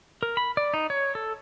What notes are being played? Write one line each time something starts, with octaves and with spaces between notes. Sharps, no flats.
A#4
B5
D5
D#4
C#5
A4